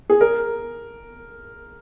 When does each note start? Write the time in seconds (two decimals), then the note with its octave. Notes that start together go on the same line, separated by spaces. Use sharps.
0.10 G#4
0.21 A#4